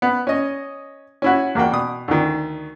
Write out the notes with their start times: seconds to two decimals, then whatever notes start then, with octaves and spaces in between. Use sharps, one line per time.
0.02 B3
0.27 C#4 D#5
1.22 C#4 E4 F#4
1.55 E2 A#3 F#4 G5
1.72 B2 D#6
2.08 D2 D#3